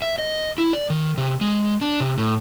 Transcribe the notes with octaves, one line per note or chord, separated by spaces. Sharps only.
E5
D#5
E4
D5
D#3
C3
G#3
D4
C3
A2